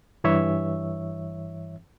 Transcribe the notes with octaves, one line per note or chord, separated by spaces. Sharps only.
G2 E3 C#5 E5